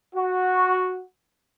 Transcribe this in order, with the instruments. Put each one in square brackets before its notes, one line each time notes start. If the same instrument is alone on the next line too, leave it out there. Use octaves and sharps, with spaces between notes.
[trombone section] F#4